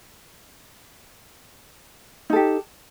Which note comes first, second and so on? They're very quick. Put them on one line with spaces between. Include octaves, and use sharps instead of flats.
D#4 A4 G4